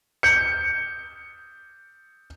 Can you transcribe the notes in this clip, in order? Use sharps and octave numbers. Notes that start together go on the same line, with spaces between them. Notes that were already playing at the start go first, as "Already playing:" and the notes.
G6 C#7